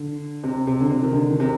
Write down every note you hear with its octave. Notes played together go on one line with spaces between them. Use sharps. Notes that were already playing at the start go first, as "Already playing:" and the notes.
Already playing: D3
C3
C3
D3
C3
D#3
D3
D#3
C3